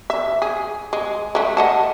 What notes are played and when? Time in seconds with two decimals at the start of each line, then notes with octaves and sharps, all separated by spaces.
0.10 E5
0.42 G#4
0.93 G#3
1.35 G#3 A3
1.57 D#5 F#5 A5